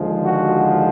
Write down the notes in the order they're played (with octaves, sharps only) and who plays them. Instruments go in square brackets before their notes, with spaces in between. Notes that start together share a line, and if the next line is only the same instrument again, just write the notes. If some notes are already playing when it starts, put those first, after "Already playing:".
Already playing: [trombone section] D#2 D3 F3 G#3
F#4